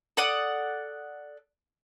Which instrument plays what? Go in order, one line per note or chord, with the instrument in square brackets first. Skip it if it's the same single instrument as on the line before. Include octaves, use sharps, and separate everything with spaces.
[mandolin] A4 D5 F#5 D#6